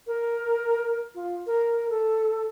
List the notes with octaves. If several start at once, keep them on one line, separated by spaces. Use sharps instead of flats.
A#4
F4
A#4
A4